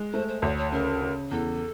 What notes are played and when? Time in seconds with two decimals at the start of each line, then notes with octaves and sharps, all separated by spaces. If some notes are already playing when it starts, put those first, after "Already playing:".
Already playing: G#3
0.13 A3 C5
0.28 C5
0.42 D2 C#5
0.57 C#5
0.72 C#3 A#4
1.01 C#3
1.31 E2 A4